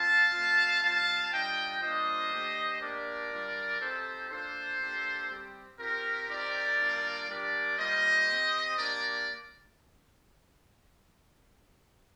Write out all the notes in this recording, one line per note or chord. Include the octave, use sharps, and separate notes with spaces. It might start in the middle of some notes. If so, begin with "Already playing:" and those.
Already playing: C4 F4 F5 A5
A3 C4 F4
G3 C4 F4 F5 A5
G3 D4 F4 D#5 G5
G3 A#3 D4 F4 C5 D#5
A3 D4 G4
A#3 D4 G4 A#4 D5
G3 D4 F4
C4 D#4 G4 A4 C5
A#3 D4 F4 A4 C5
A#3 D4 G4
G3 C4 G4
C4 F4 G4 A#4
C4 D#4 G4 A#4 D5
G3 A#3 D4 F4
G3 D4 G4 A#4 D5
G3 A#3 F4 C5 D#5
C4 G4
A#3 D4 G4 A#4 D5